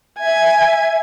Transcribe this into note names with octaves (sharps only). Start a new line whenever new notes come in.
E5 G#5